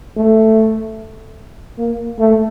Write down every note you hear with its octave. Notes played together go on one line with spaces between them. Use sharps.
A3
A#3
A3